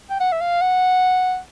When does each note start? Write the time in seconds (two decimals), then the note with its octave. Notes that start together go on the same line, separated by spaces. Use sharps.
0.10 G5
0.20 F#5
0.32 E5
0.41 F5
0.61 F#5